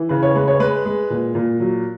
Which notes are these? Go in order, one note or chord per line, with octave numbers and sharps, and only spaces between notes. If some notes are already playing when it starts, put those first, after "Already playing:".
Already playing: E3
C#3 B4
C#5
G#3 B4
C#5
G#3 B4
G#3
A#2
A#2
F#3